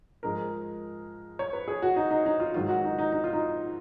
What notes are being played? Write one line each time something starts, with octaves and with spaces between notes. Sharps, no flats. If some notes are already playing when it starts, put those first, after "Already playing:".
G#2 F3 G#3 A#4
C#5
B4
G#4
F#4
D#4
D#4
D#4
F4
G#2 D#3 F#3 F4
F#4
D#4
D#4
D#4
F4
D#4